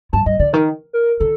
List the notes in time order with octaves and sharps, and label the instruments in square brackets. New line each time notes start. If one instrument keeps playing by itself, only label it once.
[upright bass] G2 [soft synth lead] A5
[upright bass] G2 [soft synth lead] D#5
[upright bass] D3 [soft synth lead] D5
[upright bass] D#3 [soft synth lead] A#4
[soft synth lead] A#4
[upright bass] D#3 [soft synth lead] A4